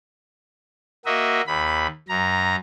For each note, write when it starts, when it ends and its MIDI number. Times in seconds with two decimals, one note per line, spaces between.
1.06 1.42 58
1.06 1.42 66
1.06 1.42 75
1.06 1.42 76
1.47 1.87 39
1.47 1.87 83
2.08 2.56 42
2.08 2.56 82